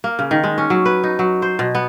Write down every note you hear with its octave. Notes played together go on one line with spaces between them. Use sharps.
A#3
C#3
D#3
G#3
C#4
F#3
B4
D#4
F#3
C5
B2
B3